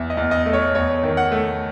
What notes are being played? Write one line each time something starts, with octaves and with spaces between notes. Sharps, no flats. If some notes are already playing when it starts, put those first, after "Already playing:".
Already playing: E2 E5
D#5
E2
D#5
A3
C#5
E2 C#5
D#3
F#5
A3